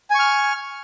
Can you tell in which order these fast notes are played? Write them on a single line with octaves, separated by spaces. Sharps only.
G#5 C#6 F6